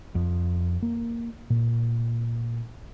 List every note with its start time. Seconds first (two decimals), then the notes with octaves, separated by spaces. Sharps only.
0.15 F2
0.82 A#3
1.50 A#2